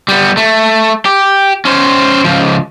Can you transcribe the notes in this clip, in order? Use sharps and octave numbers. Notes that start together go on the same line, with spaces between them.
G3 B3
A3
G4
C#4 C5
C#2 F3